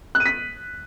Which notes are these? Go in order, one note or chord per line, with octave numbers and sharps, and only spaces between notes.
F#6
D#7
B6